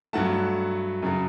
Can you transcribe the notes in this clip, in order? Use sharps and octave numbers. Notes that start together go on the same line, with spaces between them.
G2 F#3 A3 F#5 A5
F#2 C#3 F#3